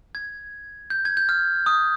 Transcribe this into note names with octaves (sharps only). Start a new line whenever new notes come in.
G#6
G6
G#6
G6
F6
D#6